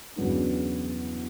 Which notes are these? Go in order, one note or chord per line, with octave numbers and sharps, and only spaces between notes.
E2 C#3 F#3 B3 D4